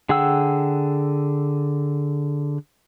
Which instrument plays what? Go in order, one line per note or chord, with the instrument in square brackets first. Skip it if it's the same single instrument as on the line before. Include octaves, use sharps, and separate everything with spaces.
[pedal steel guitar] D3 G#4 F#5 G5 E6